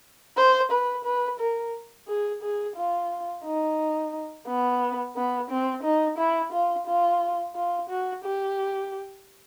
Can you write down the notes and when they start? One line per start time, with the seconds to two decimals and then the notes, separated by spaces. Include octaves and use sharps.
0.37 C5
0.71 B4
1.04 B4
1.39 A#4
2.08 G#4
2.42 G#4
2.76 F4
3.45 D#4
4.47 B3
5.16 B3
5.50 C4
5.83 D#4
6.18 E4
6.52 F4
6.87 F4
7.55 F4
7.89 F#4
8.24 G4